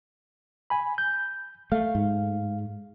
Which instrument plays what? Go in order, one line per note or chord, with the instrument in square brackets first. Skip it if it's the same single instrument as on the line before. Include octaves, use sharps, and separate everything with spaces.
[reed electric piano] G#5 B5
G6
[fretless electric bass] A3 [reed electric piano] F5
[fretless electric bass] G#2